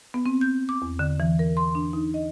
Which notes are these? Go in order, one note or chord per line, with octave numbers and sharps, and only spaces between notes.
B3
C4
G6
D6
E2
D3
E3
A#4
C6
D4
D#4
D#5